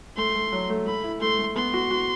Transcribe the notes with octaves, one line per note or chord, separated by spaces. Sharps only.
A3 C6
A3
F#3
A3
A3 B5
E4
A3 C6
A3
B3 C6
F#4
F#4